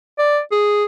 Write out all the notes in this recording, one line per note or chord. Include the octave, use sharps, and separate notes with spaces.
D5
G#4